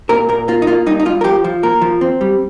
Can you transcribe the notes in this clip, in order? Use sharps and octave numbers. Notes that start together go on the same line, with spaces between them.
A#2 A#4
A#2 A#4
A#3 F4
D#4
A#3 F4
G2 D#4
D#4
G2 F4
A#4
F3 G4
F3
A#3 A#4
F3
C4
G3